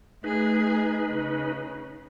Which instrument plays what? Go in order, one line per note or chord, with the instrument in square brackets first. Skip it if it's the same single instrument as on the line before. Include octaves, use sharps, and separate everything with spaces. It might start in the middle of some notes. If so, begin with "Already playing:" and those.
[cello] A3 G#4 [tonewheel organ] D#4 B4
[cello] C#3